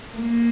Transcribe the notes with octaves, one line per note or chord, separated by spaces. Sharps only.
A#3